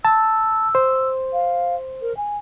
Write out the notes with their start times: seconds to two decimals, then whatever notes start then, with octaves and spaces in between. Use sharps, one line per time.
0.05 A5 E6
0.75 C5
1.33 F5
2.02 A#4
2.17 G#5